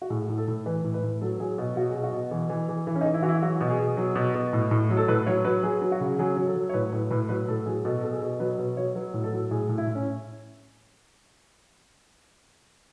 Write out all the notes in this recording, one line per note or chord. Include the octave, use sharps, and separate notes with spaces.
F#4
A2 G#4
A2
A4
A2
E3 B4
A2
B4
A2
F#3 A4
F#3 G#4
B2 F#4
F#3 F#4
G#4
B2
F#4
B2
E3
E3
E3
E3 E4
C#4
D#4
E3
E4
E3 F#4
E4
F#3 F#4
B2
G#4
B2
F#3
B2
B2
A2
A2
F#3
A4
A2 B4
F#3 C#5
F#3 B4
F#3 G#4
F#3
F#4
C#3
F#3 G#4
F#3
A4
F#3
C#5
A2 B4
A2 B4
A2 B4
F#3 B4
A2 A4
F#3 G#4
B2 A4
B2 A4
G#4
B2
F#3 B4
B2 B4
F#3 C#5
F#3 B4
A2
A4
F#3
A2 G#4
A2
E4
A2
C#4